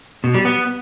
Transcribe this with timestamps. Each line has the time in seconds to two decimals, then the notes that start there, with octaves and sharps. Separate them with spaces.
0.24 B2
0.34 G3
0.45 B3